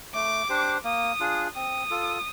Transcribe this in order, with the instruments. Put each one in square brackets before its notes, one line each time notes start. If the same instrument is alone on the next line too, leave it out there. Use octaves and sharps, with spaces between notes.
[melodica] A3 [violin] D6
[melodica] D4 G4 C5
[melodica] A#3 [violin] D#6
[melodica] D4 F4 G#4
[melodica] C4 [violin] D#6
[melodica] F4 A4